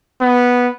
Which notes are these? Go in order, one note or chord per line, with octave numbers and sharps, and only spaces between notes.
B3